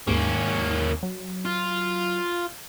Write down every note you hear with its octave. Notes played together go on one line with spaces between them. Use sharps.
D#2 G#2 A#3 C#4
F#3
F4